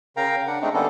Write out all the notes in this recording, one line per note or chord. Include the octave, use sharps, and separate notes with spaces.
C#3 A#4 F5 G5 A#5
D4 F#5
G#3 A3 C4 D4 D#4
D3 G3 A#3 B3 C#4 A4